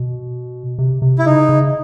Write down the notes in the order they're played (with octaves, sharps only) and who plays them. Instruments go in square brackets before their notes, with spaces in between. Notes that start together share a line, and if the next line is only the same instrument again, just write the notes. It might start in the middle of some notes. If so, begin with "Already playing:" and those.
Already playing: [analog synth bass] B2
C3
C3
[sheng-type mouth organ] E4
[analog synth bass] C#3 [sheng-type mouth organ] D#4
[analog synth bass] C#3